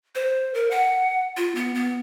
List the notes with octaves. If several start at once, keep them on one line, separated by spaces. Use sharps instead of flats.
C5
A#4
F#5
F4
B3
B3